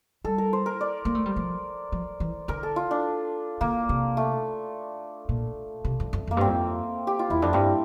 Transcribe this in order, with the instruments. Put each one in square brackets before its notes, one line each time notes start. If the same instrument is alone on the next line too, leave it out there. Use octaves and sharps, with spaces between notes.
[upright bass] G3 [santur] A4
[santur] A#4
C5
A#4
D5
[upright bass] A#3
A3
G3
F3
F3
E3
[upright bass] D3 [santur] A#4
[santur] A4
F4
D4
[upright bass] D3 [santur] A#3
[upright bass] C3
[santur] A3
[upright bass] A#2
C3
F2
F2
[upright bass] F2 [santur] A#3
[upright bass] G2 [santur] C4
[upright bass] F2
[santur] G4
F4
[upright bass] E2 [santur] E4
[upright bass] F2 [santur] D4
[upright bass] G2 [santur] C4